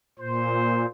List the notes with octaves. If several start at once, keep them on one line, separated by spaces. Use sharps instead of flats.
A#2 C5